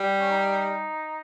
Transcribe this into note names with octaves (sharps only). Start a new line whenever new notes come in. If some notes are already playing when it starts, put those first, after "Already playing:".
Already playing: G3
C#4
D#4